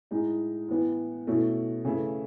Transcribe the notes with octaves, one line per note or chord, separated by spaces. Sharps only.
A2 G#3 D#4
A2 E3 B3
B2 A3 C#4 E4
C#3 E3 A3 E4